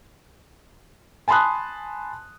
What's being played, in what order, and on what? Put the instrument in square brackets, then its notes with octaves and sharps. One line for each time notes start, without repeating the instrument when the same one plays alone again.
[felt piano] G#5 A5 B5 C6 D#6 F#6